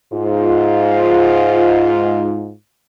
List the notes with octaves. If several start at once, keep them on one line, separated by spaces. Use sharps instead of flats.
G#2 F4